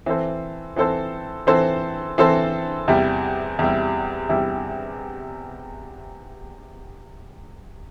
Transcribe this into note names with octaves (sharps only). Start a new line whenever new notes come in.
E3 C4 A4 C5
E3 C4 A4 C5
E3 C4 A4 C5
E3 C4 A4 C5
E2 C3 G3 E4
E2 C3 G3 E4
E2 C3 G3 E4